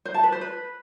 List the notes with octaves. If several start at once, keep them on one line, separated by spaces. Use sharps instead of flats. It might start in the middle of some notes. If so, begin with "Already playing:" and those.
C5
A5
B4
C5
B4